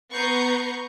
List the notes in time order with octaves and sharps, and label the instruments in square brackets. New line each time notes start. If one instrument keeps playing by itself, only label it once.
[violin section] B3 B4 A#5 C#6 G6 C7